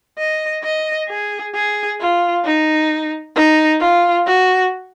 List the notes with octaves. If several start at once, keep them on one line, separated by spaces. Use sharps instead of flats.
D#5
D#5
G#4
G#4
F4
D#4
D#4
F4
F#4